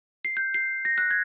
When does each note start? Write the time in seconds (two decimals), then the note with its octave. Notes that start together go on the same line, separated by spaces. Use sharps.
0.25 C7
0.37 G6
0.54 C7
0.85 A#6
0.98 F#6
1.11 G#6